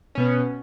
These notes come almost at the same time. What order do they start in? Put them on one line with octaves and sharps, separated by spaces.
C#4 B2 B3